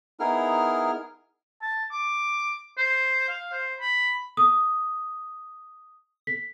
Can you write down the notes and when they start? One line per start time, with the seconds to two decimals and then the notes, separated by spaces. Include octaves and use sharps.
0.20 B3 D#4 E4 G#4 A#4 F6
1.62 A5
1.91 D6
2.77 C5
3.28 F5
3.52 C5
3.80 B5
4.37 D#6
6.27 B6